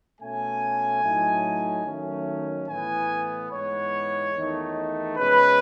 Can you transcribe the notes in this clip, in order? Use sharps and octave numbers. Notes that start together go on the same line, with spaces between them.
B2 A3 C#4 G#5
A2 F#3 A3 D#4
D#3 F#3 A3 C#4
A2 E3 B3 G#5
G#2 E3 G#3 B3 C#5
E2 D#3 A3 D#4
B2 G#3 C#4 B4